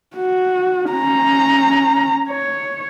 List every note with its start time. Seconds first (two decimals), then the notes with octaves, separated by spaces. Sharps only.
0.17 F#4
0.91 C#4 A#5
2.29 C#5